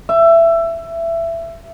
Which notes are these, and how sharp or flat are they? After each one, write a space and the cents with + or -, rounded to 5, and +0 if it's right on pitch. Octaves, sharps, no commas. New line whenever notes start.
E5 +20